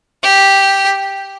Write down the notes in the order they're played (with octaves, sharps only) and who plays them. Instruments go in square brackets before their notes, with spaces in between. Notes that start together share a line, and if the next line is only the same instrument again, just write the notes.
[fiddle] G4